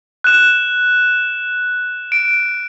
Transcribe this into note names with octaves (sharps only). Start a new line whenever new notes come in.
F#6 E7
D7